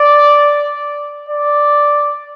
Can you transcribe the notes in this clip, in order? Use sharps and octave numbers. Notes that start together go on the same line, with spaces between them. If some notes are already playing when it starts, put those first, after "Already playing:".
Already playing: D5
D5